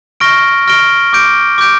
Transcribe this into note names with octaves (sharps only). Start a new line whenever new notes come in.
C#6 F6 A#6 D7 G7
C#6 F6 A#6 D7 G7
D6 G6 D7
D6 G6 D7